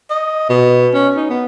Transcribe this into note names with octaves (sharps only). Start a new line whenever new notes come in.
D#5
B2
C#4
D#4
B3